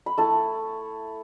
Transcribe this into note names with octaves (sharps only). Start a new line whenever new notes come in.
B5
A3 E4 A5